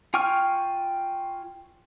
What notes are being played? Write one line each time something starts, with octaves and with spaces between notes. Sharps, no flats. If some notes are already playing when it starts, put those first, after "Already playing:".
F4 G5 G#5 C#6 F6